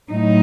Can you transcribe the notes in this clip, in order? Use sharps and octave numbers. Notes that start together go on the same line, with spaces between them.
A2 F#3 D#4